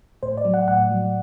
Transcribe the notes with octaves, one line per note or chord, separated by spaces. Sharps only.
A2 C5
D5
F#3
F#5
A2 F#5
F#3